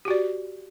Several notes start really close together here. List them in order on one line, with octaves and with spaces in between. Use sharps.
G4 F#4 D5